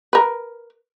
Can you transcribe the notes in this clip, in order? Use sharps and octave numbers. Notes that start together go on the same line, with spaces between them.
A#4 B4